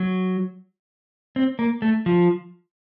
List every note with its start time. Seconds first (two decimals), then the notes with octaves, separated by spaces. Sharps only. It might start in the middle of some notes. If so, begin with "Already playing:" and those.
Already playing: F#3
1.36 C4
1.59 A#3
1.82 A3
2.06 F3